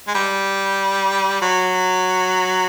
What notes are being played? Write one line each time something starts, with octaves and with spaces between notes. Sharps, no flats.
G#3
G3
F#3